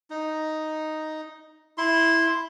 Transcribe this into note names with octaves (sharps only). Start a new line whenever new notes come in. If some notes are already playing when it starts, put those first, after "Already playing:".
D#4
E4 C6